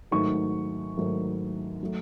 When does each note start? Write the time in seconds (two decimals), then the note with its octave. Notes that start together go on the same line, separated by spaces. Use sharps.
0.11 G#2 D#3 F#3 A3 C#6
0.97 G#2 D#3 F#3 A3
1.83 F#3 A3